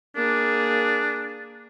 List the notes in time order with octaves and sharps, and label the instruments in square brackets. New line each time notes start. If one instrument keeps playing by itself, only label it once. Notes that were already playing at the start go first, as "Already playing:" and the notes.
[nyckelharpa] A#3 G#4 [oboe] D4